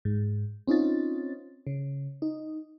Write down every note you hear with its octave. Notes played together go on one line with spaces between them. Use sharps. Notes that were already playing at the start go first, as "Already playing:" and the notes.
G#2
C4 C#4 D#4 F4 A6
C#3
D#4